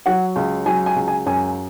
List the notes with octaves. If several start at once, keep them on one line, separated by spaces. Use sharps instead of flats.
F#3 F#5
C#2
F#3 G#5
G#5
C#2
G#5
F#2 G#5